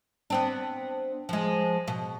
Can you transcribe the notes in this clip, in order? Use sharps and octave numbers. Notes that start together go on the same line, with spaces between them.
B3 C4 D4
F3 G#3
B2